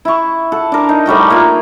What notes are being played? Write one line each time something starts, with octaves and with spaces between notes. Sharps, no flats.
E4 C#6
A4 F#5
D4 A#4
D#4
A2 G3 F#4 G5
A#3 F4